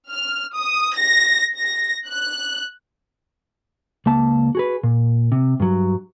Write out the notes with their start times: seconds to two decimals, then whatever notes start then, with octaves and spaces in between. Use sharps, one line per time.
0.10 F6
0.54 D#6
0.96 A#6
1.57 A#6
2.08 F#6
4.06 C#2 A#3 A5
4.55 F#4 G#4 B4
4.84 A#2
5.32 C3
5.60 G2 F#3